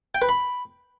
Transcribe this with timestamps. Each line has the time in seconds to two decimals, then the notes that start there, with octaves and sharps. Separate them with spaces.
0.15 G5
0.22 B4
0.29 B5